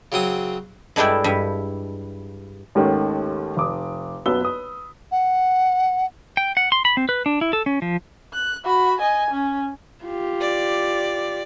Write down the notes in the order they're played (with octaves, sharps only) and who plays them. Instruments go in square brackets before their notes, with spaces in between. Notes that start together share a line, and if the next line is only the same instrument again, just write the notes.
[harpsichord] C#3 F#3 C4 D#6
[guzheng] G2 G#3 D4 E4 G5
G2
[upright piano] D#2 G#2 D#3 A3 C#4
F1 D6 D#6
B1 F#2 B3 B4 E6 G7
B4 D#6
[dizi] F#5
[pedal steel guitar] G5
F#5
C6
B5
C4
B4
D4
E4
A4
C#4
F3
[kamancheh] F#6
F#4 B5
D#5 G#5
C#4
[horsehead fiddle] F4 G4
[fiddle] D5